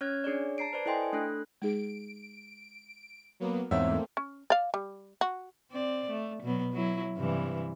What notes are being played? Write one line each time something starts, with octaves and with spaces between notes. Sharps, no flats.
C#4 C#5 F6 G#6
D4 G#4 C#5 D5
A5 A#5 C7 D7
B4 C5 D5 A5
E4 A4 D#5 G5 G#5 C6
A3 D4 A4 F#6
G#3 D#4 G#4 D7
F#3 A#3 B3
E2 G#2 A3 A#3 C4 C#5 E5 F#5
C#4
D5 F5
G3
F#4
C4 D5
A3
B2 F#3 B3
F#3 E4
G2 C3 E3